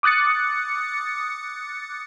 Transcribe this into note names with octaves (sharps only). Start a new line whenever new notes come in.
D6 D#6 F#6 A6 C#7